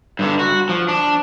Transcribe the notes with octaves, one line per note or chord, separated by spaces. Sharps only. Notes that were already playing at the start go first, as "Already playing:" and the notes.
G2 D3
F#4
F3
D4